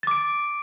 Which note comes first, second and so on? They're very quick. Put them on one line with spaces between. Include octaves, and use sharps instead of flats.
A6 D6 D7